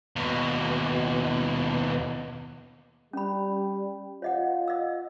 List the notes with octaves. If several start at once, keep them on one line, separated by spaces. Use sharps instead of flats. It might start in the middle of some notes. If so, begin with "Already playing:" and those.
D#2 B2
G3 C#4 B5
F4 C#5 D#5 F#5
D#5 E6